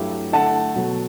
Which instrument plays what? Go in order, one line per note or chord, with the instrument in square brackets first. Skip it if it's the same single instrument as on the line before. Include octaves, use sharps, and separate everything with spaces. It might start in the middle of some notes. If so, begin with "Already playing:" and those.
Already playing: [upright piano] G2 F#3 A3 E4 G4
[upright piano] D3 A3 E4 [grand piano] F#5 A5
[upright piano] B2 F#3 B3 F#4 A4